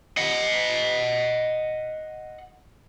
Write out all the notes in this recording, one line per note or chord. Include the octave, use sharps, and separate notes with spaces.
D#5 F#5